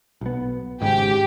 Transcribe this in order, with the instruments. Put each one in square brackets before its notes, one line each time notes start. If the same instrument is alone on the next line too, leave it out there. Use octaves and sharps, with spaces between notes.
[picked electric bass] B1 B3
[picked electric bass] G#1 G#2 C#3 [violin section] G4 G5